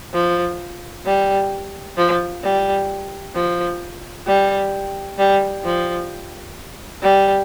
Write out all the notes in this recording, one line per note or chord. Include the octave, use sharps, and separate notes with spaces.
F3
G3
F3
G3
F3
G3
G3
F3
G3